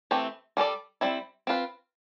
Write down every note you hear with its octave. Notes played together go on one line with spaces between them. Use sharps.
E3 A3 C4 G4
G3 D4 A4 D5
G3 C4 E4
C4 F4 B4